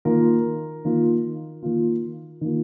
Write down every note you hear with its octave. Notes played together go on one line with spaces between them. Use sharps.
D#3 A#3 F4 A#4
D#3 A#3 F4
D#3 A#3 F4
D#3 A#3 F4